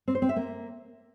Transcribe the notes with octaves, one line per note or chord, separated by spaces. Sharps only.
C4
C5
C4
E5
A#3